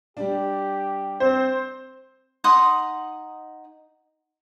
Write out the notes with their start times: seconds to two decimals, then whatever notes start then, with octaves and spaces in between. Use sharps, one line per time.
0.17 G3 D4 G4
1.20 C4 C5
2.44 D#4 F#5 C6 D#6